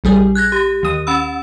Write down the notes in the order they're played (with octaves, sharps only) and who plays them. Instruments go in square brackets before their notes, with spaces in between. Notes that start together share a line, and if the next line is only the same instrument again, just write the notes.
[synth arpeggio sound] A#1 G3 G#4
[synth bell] F#6 G#6 A#6
G4
[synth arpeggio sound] D#2 D#6
[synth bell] C#4 B5 E6